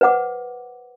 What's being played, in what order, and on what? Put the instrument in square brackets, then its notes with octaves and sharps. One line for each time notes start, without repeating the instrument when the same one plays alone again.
[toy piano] B4 C5 F#5 D6